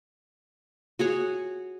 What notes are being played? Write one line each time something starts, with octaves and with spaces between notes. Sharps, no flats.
F#4 G#4 C#5